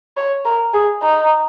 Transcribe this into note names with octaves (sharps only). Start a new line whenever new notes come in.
C#5
A#4
G#4
D#4